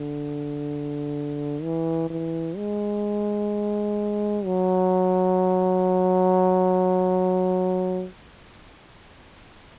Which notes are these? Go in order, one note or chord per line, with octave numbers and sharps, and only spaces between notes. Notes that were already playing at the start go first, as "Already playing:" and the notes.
Already playing: D3
E3
E3
G#3
F#3